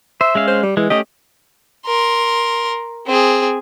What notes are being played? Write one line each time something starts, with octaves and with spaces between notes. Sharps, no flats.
C5 E5
G#3 C#4 F5
C5
G3
E3 G#3
A3 C#4 G4 D#5
A#4 C6
C4 G#4